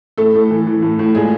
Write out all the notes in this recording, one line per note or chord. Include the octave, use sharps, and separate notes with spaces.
A2 A3 A4
A2
E3
E3
A2
A2
A#2 G#3 G#4